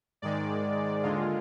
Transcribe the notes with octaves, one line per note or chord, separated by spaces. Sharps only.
G#2 D#3 G#3 D5
D#2 D3 G#3 F4